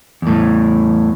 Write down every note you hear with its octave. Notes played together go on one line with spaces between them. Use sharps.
E2 A2